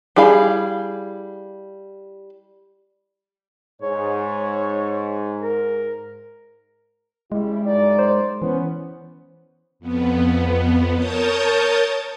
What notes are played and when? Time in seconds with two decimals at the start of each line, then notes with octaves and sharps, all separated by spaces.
0.16 G3 E4 G#4 F5 B5
3.82 G#2 C#5
5.42 A#4
7.32 C#3 G3 G#3 E4
7.66 F#2 D#4 D5
7.99 C5
8.42 E3 B3 C#4
9.80 F2 B3
10.95 A#4 C#5 A5 D#6 G6 A6